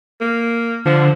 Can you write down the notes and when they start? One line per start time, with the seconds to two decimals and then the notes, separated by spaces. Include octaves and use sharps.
0.21 A#3
0.86 D3 F3